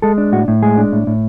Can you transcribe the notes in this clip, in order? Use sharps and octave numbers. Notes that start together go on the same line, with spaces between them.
G#3 A4
D4
A2 F#4
A2
G#3 G#4
D4
A2
A2